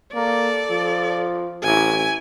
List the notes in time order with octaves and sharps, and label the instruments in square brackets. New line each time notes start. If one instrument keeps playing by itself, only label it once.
[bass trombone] A#3 [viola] A4 D5
[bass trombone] F3
[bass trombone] A1 [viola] E4 G#5